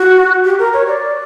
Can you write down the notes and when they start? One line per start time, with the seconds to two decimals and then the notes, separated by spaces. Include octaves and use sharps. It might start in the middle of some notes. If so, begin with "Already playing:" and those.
Already playing: F#4
0.45 G4
0.59 A#4
0.73 C#5
0.88 D5